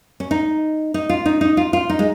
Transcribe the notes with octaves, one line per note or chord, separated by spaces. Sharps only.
C#4
D#4
D#4
F4
D#4
D#4
F4
F4
D#4
G#3